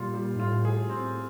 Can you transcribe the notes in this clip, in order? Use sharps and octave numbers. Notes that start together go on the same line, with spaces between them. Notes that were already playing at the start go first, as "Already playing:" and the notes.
Already playing: A#2 G3 F4
G3
G#2
A2 F4
G#4
C4